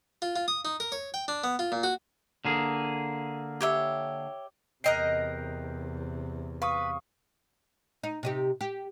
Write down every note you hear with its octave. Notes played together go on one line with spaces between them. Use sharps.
F4
F4
D#6
D#4
A#4
C#5
G5
D4
B3
F4
A#2
F#4
D3 A#3 G#4
G4 C#5 E5
E2 C3 A#4 D#5 G5 F#6 G6 C7
B4 F5 C#6 D#6
D#4
C3 D#4 G4
G4